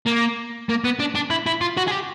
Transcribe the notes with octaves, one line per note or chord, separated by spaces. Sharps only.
A#3
A#3
B3
D4
D4
E4
E4
F4
F#4
G#4
G4